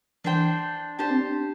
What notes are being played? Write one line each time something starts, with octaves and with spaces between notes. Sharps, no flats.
E3 D4 C5 G5
D4 G4 C5 A5
C4
D4